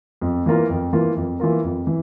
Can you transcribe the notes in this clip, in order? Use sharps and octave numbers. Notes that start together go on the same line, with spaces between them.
F2
E3 A#3 F4 A#4
F2
E3 A#3 F4 A#4
F2
E3 A#3 F4 A#4
F2
E3